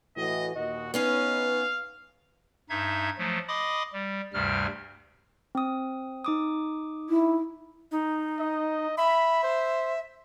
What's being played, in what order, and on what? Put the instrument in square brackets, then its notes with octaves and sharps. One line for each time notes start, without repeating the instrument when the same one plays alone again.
[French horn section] A2 E3 F#4 [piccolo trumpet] D#5
[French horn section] D#2 A#2 D#5 [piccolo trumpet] F#4
[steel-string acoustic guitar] B3 C#4 C#5 [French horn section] D#4 B4 [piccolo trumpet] F5
[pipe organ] G2 D#4 E5 G#6
F3 F#3 A3
D#5 B5 C6 D6 D#6
G3
D2 G2 C3 G3 F6
[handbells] C4 D#6
D#4 D6 D#6
[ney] E4
[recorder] D#4
[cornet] D#5
[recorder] E5 [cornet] B5
[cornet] C5